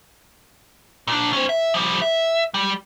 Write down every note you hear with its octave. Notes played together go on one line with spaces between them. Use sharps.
A#2 D4
C#4 C5
E5
F3 G3
E5
G3